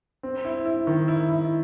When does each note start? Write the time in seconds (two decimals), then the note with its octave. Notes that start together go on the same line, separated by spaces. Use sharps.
0.23 C4
0.45 E4
0.66 E4
0.87 D#3
1.08 E4
1.29 E4